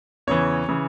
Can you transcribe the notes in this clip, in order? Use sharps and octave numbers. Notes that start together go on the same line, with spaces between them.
E2 C#3 E3 C#5
C#3 E3